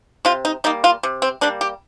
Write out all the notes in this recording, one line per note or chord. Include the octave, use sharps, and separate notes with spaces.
C3 F4
D#4
G3 A#3 D#4
F4
C3
C4
G3 A#3 D4
G4